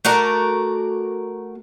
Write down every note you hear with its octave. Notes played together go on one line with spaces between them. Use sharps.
A3 F#4 A#4 D5